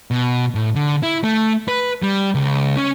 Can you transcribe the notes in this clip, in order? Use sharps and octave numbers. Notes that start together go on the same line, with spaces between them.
B2
A2
D3
E4
A3
B4
G3
C#2
C#4